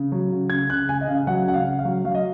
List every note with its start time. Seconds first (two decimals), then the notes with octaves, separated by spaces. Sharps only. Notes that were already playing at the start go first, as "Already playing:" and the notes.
Already playing: C#3
0.12 F#3
0.31 C#3
0.50 C#3 G#6
0.70 C#3 F#6
0.89 C#3 G#5
1.01 D#5
1.08 C#3 F5
1.27 F#3 F#5
1.47 C#3 F#5
1.54 F5
1.66 C#3
1.79 F5
1.85 F#3
2.05 F#3 F5
2.15 D#5